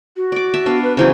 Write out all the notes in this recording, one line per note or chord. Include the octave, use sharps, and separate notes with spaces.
F#4
D5 D6
E5 A5
B3 D4 F5
B4
C#3 E3 F#3 C5